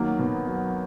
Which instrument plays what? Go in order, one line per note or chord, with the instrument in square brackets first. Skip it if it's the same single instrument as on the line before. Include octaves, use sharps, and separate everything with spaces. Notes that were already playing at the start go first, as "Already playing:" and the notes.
Already playing: [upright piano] D#3 F#3 A#3
B2
F#3